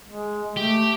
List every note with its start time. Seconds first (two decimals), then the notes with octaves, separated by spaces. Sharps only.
0.09 G#3
0.56 A3 G4